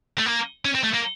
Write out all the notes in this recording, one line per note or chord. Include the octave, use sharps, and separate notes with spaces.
A3
A#3
C#4
C4
A3
A#3